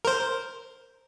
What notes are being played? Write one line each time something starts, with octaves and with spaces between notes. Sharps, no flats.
A#4 C5